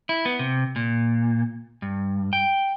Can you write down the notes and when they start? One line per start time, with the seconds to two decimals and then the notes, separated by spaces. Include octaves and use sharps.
0.09 E4
0.25 B3
0.39 C3
0.76 A#2
1.82 G2
2.33 G5